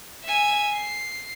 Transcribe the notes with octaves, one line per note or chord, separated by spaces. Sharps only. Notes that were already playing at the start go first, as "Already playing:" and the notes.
E5 G#5
C7